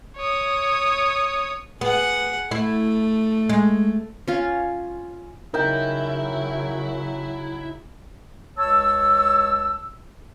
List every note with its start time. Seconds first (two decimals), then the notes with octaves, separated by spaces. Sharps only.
0.17 C#5 D#6
1.81 B3 G#4 F#5
2.51 A3 E4
3.49 G#3
4.28 C#4 F4
5.54 C#3 F#3 D#4 E4 A#4 G5
8.58 C#2 C#5 A5 E6